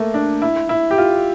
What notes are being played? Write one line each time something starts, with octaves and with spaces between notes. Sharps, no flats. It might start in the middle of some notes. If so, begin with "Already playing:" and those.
Already playing: A3 A#3
D4
E4
E4
G4
F4